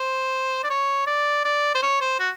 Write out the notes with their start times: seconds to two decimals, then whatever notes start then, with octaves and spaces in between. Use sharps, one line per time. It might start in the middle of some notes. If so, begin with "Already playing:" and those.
Already playing: C5
0.64 D5
0.70 C#5
1.07 D5
1.45 D5
1.75 C5
1.82 C#5
2.01 C5
2.20 F#4